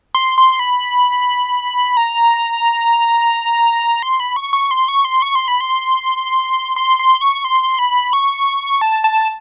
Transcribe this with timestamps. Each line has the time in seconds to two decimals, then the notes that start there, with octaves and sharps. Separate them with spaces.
0.15 C6
0.38 C6
0.59 B5
1.97 A#5
4.03 C6
4.20 B5
4.36 C#6
4.53 C#6
4.71 C6
4.88 C#6
5.05 C6
5.22 C#6
5.35 C6
5.48 B5
5.61 C6
6.76 C6
6.99 C6
7.21 C#6
7.45 C6
7.79 B5
8.13 C#6
8.81 A5
9.04 A5